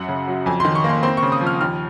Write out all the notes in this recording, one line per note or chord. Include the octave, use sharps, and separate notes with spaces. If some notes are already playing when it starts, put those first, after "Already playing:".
Already playing: F#2 F#5
C#3
F#3
F2 G#5
C6
D#3
C#6
A#3
C6
C4 C6
C#6
C#3
D#6
F3
F6
D#2 F6